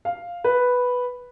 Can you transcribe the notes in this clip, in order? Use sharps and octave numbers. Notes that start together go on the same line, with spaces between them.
F5
B4